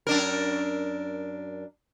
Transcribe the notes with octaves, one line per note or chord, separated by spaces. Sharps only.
F#2 D4 A#4